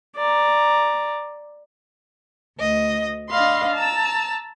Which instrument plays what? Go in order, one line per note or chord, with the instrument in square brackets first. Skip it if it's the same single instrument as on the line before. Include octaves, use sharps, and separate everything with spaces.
[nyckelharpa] D5 A#5
[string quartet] D2 D#5
D4 D#5 F5 B5 C6
A5 A#5 E6